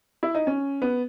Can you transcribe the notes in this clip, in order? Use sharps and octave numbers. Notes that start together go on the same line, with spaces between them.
E4
D#4
C#4
B3